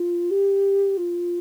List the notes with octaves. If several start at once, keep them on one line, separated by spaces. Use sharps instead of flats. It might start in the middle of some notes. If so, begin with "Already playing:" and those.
Already playing: F4
G4
F4